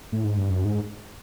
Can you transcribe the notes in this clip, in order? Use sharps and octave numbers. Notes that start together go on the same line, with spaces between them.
A2
G#2
G2
F#2
G#2